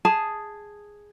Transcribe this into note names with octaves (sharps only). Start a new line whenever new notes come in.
G#4 A5